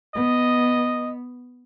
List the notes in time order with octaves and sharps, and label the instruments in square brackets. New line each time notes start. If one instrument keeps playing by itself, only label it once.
[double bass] B3 [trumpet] D#5